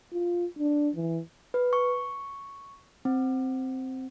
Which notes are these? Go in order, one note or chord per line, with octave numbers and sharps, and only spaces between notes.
F4
D4
E3
B4
C#6
C4